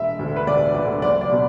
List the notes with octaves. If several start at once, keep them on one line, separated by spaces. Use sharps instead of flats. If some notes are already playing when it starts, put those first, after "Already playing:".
Already playing: E1 E5
D2 D3
B4
E1 D5
D2 D3 D5
F#1 D5
D5
B2 B3